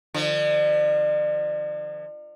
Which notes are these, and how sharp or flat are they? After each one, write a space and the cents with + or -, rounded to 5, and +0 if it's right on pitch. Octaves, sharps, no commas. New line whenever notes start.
D3 +40 F3 -5